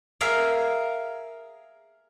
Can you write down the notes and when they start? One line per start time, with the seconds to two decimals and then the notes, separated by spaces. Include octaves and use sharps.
0.21 G#4 A#4 E5 F5